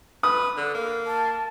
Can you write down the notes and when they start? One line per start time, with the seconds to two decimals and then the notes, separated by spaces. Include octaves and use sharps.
0.23 B4 D#6
0.57 D3
0.74 A#3
1.07 A5